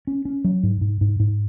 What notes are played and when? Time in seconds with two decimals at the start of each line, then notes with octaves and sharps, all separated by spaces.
0.07 C#4
0.25 C#4
0.44 F#3
0.63 G#2
0.81 G#2
1.01 G#2
1.20 G#2